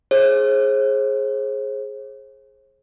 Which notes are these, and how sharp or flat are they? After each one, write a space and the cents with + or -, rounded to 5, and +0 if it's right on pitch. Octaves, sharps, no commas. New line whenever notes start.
G#4 +10 C5 +45